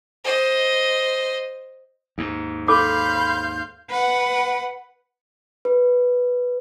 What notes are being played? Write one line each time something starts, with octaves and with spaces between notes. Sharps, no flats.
C5 D#5
D#2 G#2
A4 F5 B5 C6 D6 G6
B4 F#5
B4